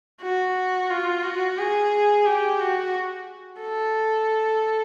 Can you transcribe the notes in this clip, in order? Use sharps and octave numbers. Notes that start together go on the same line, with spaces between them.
F#4
F4
F#4
G#4
G4
F#4
A4